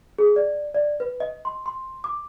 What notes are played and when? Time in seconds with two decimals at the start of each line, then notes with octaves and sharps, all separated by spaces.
0.18 G#4
0.36 D5
0.75 D5
1.00 B4
1.20 D#5
1.45 C6
1.66 C6
2.04 D6